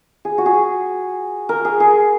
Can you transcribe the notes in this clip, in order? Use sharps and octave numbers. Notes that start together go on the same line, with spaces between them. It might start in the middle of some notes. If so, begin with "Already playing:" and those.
G#4
F#4
G#4
A#4
G#4
G#4